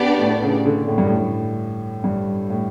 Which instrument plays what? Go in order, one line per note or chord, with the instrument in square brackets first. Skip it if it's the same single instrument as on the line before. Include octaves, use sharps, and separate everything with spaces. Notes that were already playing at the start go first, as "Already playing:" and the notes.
Already playing: [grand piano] C#3 [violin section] B3 D4 G4 D5
[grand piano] A2
C#3
D3
A2
G2
A2
G2
A2